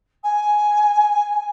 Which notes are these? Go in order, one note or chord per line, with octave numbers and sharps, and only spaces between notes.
G#5